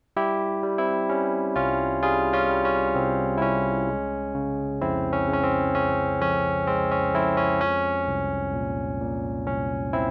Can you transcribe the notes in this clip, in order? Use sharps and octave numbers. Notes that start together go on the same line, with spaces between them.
G3 E4 G4
G3
C4 E4
G3 C#4
C2 C#4 F4
G3 F4 G#4
C#4 F4
G3
C#4
C2 C4
E4
C2 C#4
G#3
C#3
F2 C4 E4
C#4
C#3
C#4
C4
C#3 C#4
F2 C#4
G#3 C4
C#4
F2 C4 E4
C#4
F3 C#4
C2
A#2
A#2
C2 C#4
C4 E4